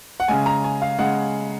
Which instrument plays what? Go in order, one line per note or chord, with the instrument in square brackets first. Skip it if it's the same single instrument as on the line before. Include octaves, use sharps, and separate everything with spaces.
[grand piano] F#5
C#3 G#3 G#5
A#5
G#5
F5
C#3 G#3 F#5